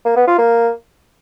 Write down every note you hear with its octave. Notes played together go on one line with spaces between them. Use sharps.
A#3
B3
F4
A#3